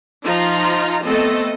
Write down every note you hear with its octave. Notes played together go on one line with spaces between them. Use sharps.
F3 D#4 F4 A#5
A3 B3 C4 A4 D#5